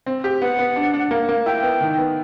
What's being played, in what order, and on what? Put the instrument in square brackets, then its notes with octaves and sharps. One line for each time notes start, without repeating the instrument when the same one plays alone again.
[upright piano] C4
G4
[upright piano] B3 [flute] F#5
[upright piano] B3
D4
D4
A#3
A#3
[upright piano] E4 [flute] G5
[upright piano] B3
D#3
B3